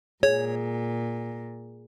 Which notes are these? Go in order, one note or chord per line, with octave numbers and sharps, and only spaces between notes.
A#2 G#4 C#5